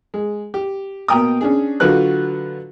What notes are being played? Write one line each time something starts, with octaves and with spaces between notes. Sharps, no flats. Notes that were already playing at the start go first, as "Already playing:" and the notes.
G#3
G4
B2 A#3 G5 A#5 D#6
C#4 D4 G#4
D3 F#3 F4 F#4 B4 F#6